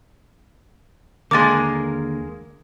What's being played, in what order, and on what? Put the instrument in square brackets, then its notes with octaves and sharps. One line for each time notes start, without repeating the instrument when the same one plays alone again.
[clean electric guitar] D#2 D3 [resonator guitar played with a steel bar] G#3 A#3 A#4 [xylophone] D6 A6